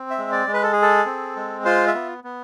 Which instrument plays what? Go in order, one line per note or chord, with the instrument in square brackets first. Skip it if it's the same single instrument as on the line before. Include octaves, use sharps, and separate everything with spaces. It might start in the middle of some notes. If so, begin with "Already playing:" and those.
Already playing: [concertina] C4
E5
G#3
D5
G#3
B4
A4
G#4
A4
C4
G#3
F4 C5
E5
B3
B3